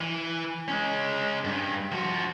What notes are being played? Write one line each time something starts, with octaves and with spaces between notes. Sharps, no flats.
E3
G#3 C#4
G2
F3 F#4